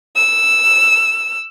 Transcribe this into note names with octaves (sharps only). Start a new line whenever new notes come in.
E6